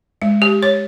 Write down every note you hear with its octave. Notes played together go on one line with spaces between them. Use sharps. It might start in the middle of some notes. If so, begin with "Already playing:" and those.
G#3
G4
C#5